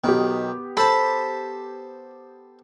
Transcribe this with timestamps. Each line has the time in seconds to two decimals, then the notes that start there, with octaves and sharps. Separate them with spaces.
0.04 B1 D#3 B3 G4
0.77 A4 C5 A5 B5